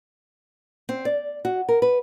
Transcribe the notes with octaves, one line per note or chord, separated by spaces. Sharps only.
C4
D5
F#4
A#4
B4